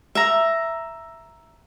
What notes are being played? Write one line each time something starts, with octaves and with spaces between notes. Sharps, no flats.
E5 A#5